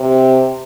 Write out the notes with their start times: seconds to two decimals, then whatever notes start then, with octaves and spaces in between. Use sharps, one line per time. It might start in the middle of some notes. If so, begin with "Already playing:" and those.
Already playing: C3